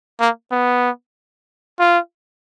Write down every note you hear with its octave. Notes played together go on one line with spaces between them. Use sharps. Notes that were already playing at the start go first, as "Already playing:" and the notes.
A#3
B3
F4